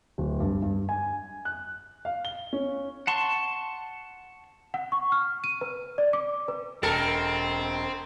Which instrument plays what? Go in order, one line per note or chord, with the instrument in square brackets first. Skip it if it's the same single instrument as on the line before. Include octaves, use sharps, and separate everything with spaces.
[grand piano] D1
G2
G2
G#5
F#6
F5
G7
C#4
[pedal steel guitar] F#5 A5 C6 C#6
[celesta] F#5
C#6
F6
D#7
B4
D5
D6
B4
[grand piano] E1 A6 [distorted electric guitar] C4 [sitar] A4 A#4